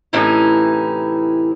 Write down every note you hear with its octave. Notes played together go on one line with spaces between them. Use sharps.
A2 C3 E3 C#4 D#4 E4